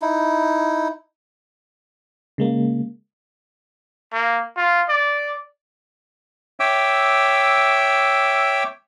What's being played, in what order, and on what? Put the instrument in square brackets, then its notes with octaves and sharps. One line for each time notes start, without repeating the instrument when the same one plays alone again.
[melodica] D#4 E4
[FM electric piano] C#3 G#3 A#3
[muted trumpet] A#3
F4
D5
[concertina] C#5 E5 G5 D6 E6